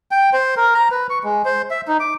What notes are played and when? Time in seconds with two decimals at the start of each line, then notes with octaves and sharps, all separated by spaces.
0.11 G5
0.33 C5
0.57 A#4
0.75 A#5
0.91 B4
1.10 C#6
1.24 G#3
1.45 C5
1.71 E5
1.88 D#4
2.00 D6